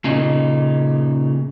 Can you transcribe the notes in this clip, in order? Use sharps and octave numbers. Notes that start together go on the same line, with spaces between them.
A#2 C#3 D#4